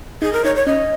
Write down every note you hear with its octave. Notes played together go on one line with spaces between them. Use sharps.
D#4 G#4
A#4
D#4 C#5
C#5
C#4 D#5